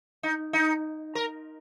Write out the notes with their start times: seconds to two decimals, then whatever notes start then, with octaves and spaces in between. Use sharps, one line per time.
0.23 D#4
0.53 D#4
1.15 A#4